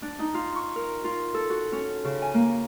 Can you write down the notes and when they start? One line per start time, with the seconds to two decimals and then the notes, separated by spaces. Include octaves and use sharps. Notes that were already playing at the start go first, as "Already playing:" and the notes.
0.02 D4
0.19 D#4
0.34 F4
0.56 C#6
0.76 A#4
1.04 F4
1.34 A4
1.50 F#4
1.72 C#4
2.05 C#3
2.22 G#5
2.34 A#3